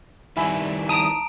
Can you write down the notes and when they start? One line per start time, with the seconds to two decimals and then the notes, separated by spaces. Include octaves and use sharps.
0.37 D#3 G3 E4 E5 G#5 B5
0.89 A5 A#5 D#6 D7